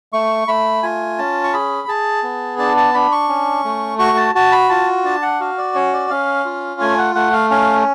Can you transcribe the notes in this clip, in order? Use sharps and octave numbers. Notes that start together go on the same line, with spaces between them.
A3 C#6
A3 B5
F4 G#5
C#4 A5
C#6
G#4 B5
G#4 A5
B3
D4 A5
A5
D4 B5
C#6
C#4
A3
F#4 C#6
A5
F#4 A5
B5
F4 A5
D4 A5
F#5
F#4 F5
D5
C#4 C#5
D5
C#4 F5
F4
A3 G#5
F#5
A3 F#5
F5
C#4 F5